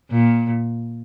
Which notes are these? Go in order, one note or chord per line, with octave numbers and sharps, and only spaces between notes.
A#2